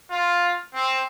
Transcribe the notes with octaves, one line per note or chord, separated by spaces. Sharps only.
F4
C4